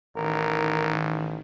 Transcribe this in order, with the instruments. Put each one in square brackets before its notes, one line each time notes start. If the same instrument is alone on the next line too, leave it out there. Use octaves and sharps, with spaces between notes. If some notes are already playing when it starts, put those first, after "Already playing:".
[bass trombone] A1 [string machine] D#3 [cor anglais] A#4